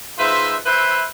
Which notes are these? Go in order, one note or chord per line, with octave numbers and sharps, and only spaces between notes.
G#2 F4 B4 C5 E5
E4 B4 C5 E5